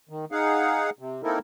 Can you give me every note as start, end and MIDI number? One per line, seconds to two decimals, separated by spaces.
0.09 0.25 51
0.32 0.90 63
0.32 0.90 68
0.32 0.90 77
0.32 0.90 78
0.99 1.21 48
1.24 1.39 58
1.24 1.39 60
1.24 1.39 63
1.24 1.39 64
1.24 1.39 69
1.24 1.39 70